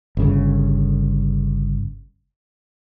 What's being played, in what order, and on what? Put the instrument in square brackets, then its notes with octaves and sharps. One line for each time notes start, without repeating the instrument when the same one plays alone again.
[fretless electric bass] G1 C#3